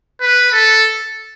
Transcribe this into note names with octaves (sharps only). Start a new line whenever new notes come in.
B4
A4